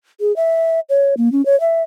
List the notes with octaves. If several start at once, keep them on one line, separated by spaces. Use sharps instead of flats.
G#4
E5
C#5
A#3
C#4
C#5
E5